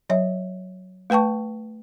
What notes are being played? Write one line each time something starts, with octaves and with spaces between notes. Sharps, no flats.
F#3 C#5 E5
A3 B4 G5 A5 C#6